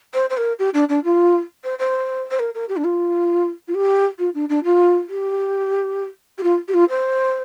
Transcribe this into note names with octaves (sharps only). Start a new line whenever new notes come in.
C5
C5
A#4
G4
D4
D4
F4
C5
C5
C5
A#4
A#4
G4
D4
F4
F4
G4
F4
D4
D4
F4
G4
G4
F4
G4
F4
C5